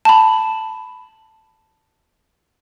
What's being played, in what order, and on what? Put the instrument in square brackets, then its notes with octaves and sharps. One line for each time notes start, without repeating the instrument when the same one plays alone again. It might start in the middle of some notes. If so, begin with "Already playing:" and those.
[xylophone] A5 B5